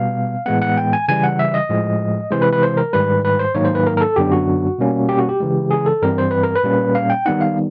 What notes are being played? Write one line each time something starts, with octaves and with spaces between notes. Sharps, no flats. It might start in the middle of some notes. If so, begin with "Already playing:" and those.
Already playing: B2 G3 B3 F5
A2 E3 G#3 B3 F#5
F#5
G5
G#5
C#3 E3 G3 G#5
F#5
E5
D#5
A2 F3 G#3
C3 E3 G#3 C5
B4
B4
C5
A#4
G#2 D#3 G3 B4
B4
C5
G#2 D#3 F#3 A#3 D#4 C#5
C5
B4
A#4
A#4
A4
F#2 D3 F#3 B3 D4 G4
F#4
B2 G3 A#3 C#4
G4
F#4
G4
C#3 E3 G#3
G#4
A4
G2 E3 G3 C4 A#4
C5
B4
A#4
B4
A#2 G3 A#3 C#4
F5
G5
D#3 G3 B3 D#4 F#5
F5